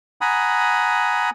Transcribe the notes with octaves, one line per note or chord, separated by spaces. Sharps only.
F#5 G#5 A#5 B5 D#6